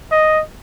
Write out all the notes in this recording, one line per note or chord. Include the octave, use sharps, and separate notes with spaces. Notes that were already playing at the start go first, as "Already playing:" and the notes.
D#5